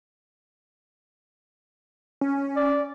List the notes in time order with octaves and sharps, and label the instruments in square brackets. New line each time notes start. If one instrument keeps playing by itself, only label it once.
[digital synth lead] C#4
[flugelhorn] D5